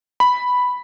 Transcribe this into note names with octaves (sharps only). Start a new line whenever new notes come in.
B5